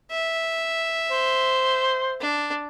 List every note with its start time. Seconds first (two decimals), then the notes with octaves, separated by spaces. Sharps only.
0.11 E5
1.11 C5
2.21 D4